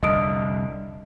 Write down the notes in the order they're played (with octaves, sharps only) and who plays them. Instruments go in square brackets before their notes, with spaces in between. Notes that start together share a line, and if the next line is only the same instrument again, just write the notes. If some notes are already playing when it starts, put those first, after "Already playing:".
[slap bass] C2 F2 D3 [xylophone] D#5 D#6 D7